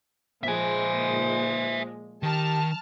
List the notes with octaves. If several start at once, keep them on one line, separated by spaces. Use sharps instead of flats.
A#2 F3 G#3 C5 E5 G#5
D#3 G4 A5 F6